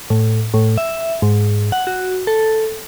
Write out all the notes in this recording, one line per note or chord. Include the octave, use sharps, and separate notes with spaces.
A2
A2
E5
G#2
F#5
F#4
A4